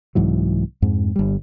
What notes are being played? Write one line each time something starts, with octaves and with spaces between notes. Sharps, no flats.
C2 G#2 E3 F#3
F2 G#2
G1 G3